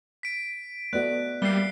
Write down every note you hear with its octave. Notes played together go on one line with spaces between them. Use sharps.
B6 D7
A3 B3 F#4 D5 D#5 F#6
G3 A#3 E5 C7 G7